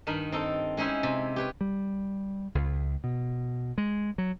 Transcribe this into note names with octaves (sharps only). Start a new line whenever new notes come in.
G2 D#3 D#4 A#4 B5
C4 D#4 A4
G#3 C#4 D#4 E4 C5
C3
G4 B4 C#5
G3
C#2
B2
G#3
F#3